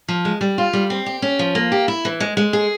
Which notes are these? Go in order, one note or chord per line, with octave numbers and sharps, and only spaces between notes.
F3
G#3
G3
F4
G3
C4
G4
C#4
F3
A#3
G4
E4
E3
G#3
G#3
G#4